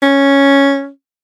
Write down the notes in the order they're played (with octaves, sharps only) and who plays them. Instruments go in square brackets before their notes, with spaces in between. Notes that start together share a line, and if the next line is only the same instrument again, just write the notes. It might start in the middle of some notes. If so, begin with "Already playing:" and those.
[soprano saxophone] C#4